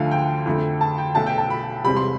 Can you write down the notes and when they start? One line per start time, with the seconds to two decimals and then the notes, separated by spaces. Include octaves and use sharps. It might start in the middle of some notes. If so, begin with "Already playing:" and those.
Already playing: D2 D3 F3 A3 F5
0.11 G5
0.46 F2 D3 A3
0.81 A5
0.98 G5
1.15 B1 B2 A3 A5
1.26 G5
1.38 A5
1.50 B5
1.84 E1 E2 C3 G3 B5
1.96 C6